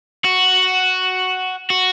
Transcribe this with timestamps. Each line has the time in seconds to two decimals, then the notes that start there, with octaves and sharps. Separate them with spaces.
0.25 F#4
1.70 F#4